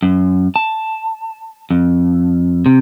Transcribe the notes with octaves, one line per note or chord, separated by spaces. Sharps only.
F#2
A5
F2
C3